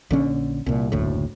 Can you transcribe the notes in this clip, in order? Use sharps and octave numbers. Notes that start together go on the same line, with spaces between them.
A#1 D3 C#4
C2 A#2
F#1 D2 A2